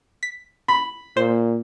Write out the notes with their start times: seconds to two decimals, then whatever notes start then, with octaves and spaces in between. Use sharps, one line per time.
0.23 B6
0.68 B5
1.17 A#2 C5